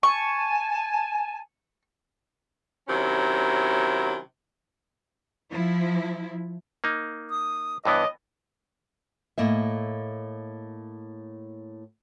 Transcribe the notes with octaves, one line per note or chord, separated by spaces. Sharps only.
G#5 A5 C#6
C3 D#3 F#3 C#4 E4 A#5
F3 E4
A#3 D#4
D#6
G2 E3 B3 C#5 D#5 D6
A2 A#3 D#5 E5